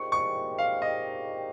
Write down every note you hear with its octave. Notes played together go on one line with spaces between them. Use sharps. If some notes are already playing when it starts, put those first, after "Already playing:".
Already playing: A#2 G#3 C4 D#4 G4 C#6
C#6
F5
D#5